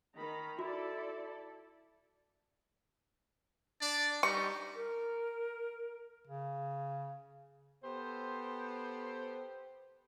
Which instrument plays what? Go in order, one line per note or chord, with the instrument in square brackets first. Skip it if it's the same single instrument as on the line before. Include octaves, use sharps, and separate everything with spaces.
[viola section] D#3 A#5 B5
[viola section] E4 A4 D5 [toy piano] F#4
[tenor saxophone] D4 [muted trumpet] D5
[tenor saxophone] G3 [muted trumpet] D#4 [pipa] C#6
[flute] A#4
[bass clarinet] C#3
[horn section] B3 G4 A4 C5